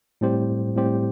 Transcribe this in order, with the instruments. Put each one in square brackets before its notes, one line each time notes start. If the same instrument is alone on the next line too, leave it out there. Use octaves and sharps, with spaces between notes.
[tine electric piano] A2 G3 C4 G4 C5
A2 G3 C4 G4 C5